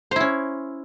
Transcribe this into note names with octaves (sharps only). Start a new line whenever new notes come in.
C#4 E4 C5